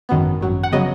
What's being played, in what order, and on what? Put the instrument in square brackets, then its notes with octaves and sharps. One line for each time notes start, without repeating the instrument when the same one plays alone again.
[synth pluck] G#1 F#2 D#3 F#3 B3
G#1 F#2 F#3
F#5
C#3 F#3 B3 D#5